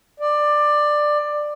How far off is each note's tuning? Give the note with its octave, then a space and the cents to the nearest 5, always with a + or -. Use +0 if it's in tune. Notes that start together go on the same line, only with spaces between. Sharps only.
D5 +15